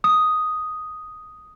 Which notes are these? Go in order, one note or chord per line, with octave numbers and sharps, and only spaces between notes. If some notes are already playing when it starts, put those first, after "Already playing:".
D#6